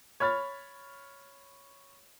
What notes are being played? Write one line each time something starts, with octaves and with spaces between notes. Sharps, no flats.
C#5 B5 F6 A6